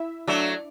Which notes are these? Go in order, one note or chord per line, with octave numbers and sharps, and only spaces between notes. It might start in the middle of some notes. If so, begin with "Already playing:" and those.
Already playing: E4 E5
F#3 A3 D4 D5